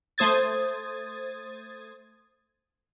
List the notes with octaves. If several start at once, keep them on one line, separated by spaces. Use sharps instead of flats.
A3 C5 D#6 G#6 A6